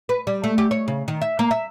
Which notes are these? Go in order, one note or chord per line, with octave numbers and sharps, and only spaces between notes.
B4
G3
A3
G4
C#5
C#3
D#3
E5
A#3
E5